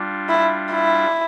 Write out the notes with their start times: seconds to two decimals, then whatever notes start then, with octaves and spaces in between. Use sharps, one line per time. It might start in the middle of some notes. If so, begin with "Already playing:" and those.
Already playing: G3 D4 F4
0.29 E4
0.72 E4